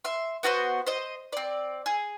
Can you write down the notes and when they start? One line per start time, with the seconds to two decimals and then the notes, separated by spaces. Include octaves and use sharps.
0.05 E5 C6
0.43 B3 F#4 A4 C5
0.86 C5 D#5
1.32 C4 D5
1.86 G#4